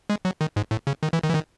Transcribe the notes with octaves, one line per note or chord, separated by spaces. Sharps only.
G#3
F#3
D#3
G#2
A2
C#3
D#3
E3
D#3
E3
D#3